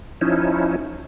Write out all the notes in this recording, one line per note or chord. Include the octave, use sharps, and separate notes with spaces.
F3 C#4 D#4 E4